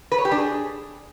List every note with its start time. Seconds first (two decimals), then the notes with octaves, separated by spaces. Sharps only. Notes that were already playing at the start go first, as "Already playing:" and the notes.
0.12 B4
0.18 C#5
0.25 G4
0.32 D4
0.38 G#4